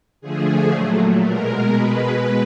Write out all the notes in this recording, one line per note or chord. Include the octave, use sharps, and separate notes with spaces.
D3 F3 A3 G#4
A#2 F#3 A3
B2 G#3 A#4
B2 G#3 B4